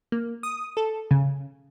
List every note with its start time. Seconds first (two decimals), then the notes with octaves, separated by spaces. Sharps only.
0.12 A#3
0.43 D#6
0.77 A4
1.11 C#3